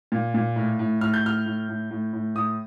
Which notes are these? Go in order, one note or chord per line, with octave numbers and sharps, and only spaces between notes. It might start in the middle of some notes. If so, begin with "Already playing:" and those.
A#2
A#2
A2
A2
A2 F6
G6
A2 F6
A2
A2
A2
A2
A2 D#6